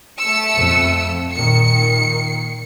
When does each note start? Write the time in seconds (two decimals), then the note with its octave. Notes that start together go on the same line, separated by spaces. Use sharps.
0.18 A3 E6 C#7
0.56 F2
1.34 A#2 D#3 C#7